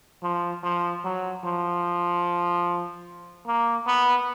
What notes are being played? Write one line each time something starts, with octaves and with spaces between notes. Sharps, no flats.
F3
F3
F#3
F3
A#3
B3